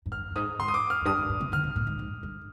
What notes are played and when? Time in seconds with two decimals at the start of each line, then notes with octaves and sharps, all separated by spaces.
0.06 G#2
0.12 G2 F6
0.31 G2
0.36 G#2 D#6
0.59 G#2 C6
0.68 D#6
0.74 D6
0.90 F6
1.01 F2
1.05 G2 D#6
1.18 G2
1.29 G#2
1.40 C3
1.52 D3 F6
1.64 C3
1.76 A#2
1.87 G#2
1.99 G#2
2.23 G2